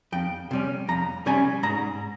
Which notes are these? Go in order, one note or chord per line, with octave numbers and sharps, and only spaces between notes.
F2 G5
C3 G3 C#4
F2 A#5
C3 G3 C#4 G#5
G#2 A#5